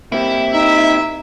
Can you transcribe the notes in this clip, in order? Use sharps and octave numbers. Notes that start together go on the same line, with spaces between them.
A#3 C4 E4 G4
D#4 E5